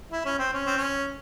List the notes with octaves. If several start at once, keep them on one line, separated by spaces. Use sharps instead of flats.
E4
C#4
C4
C#4
C4
C#4